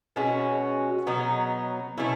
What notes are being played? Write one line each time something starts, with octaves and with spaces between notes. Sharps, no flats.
B2 G#3 C#4 F#4
B2 F#3 B3 D#4
B2 A3 C#4 E4